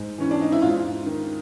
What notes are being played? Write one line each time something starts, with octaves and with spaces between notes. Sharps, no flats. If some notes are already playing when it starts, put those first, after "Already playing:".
Already playing: G#2
E3 C#4
D4
D#4
E4
G#2 F4
D#3